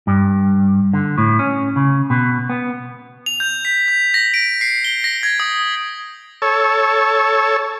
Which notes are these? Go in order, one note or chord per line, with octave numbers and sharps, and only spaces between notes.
G2
D3
A2
C#4
C#3
B2
B3
F7
G6
B6
G6
A#6
D7
C7
G7
A#6
G#6
D#6
A4 C#5